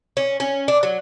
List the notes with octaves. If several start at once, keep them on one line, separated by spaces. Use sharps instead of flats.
C#4
C#4
D4
F#3